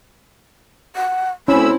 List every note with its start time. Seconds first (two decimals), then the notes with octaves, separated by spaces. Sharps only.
0.96 F#5
1.48 D2 C4 C#4 E4 B5 E6